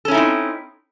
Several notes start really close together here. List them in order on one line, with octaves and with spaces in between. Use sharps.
A4 C#4 E4 D#4 C4